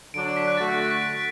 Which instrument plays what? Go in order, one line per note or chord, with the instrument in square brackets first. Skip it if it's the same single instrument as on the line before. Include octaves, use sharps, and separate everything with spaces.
[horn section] D3 F#3 D4 [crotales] D7
[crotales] B6
F#6
[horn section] D3 A3 F#4 [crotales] A6
[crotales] F#6
A6
B6
D7